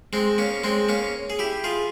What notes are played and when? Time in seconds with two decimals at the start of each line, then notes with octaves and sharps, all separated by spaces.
0.13 G#3 C4
0.38 A#3 C#4
0.64 G#3 C4
0.89 A#3 C#4
1.30 G#4
1.39 E4 G4
1.64 F4 G#4